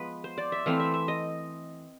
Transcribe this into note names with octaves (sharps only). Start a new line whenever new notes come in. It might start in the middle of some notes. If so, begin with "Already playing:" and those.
Already playing: F3 G#3 B3 B4
C5
D5
E5
E3 A3 C4 F5
E5
E5
D#5